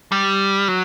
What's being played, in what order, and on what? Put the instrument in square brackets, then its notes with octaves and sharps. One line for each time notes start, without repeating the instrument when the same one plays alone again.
[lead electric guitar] G3
F#3